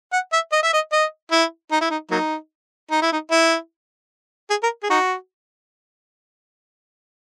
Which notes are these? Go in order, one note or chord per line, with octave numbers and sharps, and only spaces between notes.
F#5
E5
D#5
E5
D#5
D#5
E4
D#4
E4
D#4
F#3 A#3 D#4
D#4
E4
D#4
E4
G#4
A#4
G#4
D#4 F#4